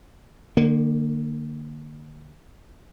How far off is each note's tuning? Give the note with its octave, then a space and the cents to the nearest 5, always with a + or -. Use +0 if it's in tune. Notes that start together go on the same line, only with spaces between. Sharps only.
D3 +35 A#3 -15